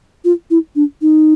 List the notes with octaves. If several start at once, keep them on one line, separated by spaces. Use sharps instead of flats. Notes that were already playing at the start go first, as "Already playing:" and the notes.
F4
E4
D4
D#4